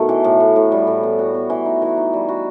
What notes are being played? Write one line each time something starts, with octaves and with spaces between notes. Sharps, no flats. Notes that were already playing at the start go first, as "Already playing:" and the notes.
Already playing: B2 D#3 A3
E3
A2
B3
A2
G3
A2
B3
F#4
B3
E3
D#4
E3
D#4
G3
F#4